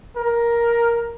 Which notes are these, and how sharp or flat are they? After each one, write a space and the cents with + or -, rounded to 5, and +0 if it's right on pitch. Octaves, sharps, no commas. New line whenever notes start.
A#4 +10